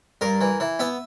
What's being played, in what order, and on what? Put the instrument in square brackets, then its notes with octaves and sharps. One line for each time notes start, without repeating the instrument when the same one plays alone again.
[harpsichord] G2 A#4
E3
E3
B3 E5